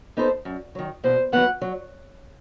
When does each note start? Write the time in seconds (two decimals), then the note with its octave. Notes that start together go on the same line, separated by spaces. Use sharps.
0.17 B3 D#4 A4 C5
0.45 F#2
0.75 D#3 F#3
1.04 B2 C5
1.32 F#3 B3 F#5
1.61 F#3